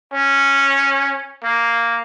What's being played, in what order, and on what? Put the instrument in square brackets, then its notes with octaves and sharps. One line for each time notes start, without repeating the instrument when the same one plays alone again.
[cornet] C#4
A#3